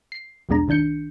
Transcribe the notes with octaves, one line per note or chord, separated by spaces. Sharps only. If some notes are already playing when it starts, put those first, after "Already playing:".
C7
B1 E2 B2 G#3 D4 A#5
B1 D#3 D4 G6 C#7